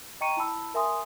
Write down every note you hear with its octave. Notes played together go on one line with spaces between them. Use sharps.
D#5 G5 A#5 C#6 C#7 D#7
E4 A5 B5 E6
A#4 E5 G#5 C6 D#6